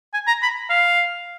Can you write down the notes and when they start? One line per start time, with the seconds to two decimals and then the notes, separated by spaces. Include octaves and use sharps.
0.14 G#5
0.27 A#5
0.42 B5
0.70 F5